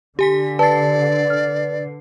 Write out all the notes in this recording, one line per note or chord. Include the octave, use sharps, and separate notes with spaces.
D3 G4 G#5 B6
B4 D5 A5 A6 C7
F6